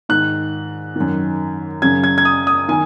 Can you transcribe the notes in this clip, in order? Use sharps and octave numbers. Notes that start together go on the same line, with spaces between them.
G#2 D#3 F#6
F#2 D#3
F#2 C#3 G#6
G#6
G#6
D#6
D#6
D#3 G#5